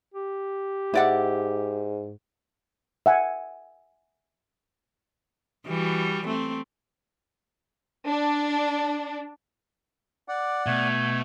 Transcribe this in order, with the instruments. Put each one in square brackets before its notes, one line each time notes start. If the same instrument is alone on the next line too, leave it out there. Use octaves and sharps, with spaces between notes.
[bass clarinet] G4
[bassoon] G#2 [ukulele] E4 D5 F#5
[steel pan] E5 F#5 G#5
[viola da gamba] E3 G3 F#4
A3 C4
[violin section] D4
[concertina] D5 F#5 [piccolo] D6
[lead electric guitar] B2 [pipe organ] A3 [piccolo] G#6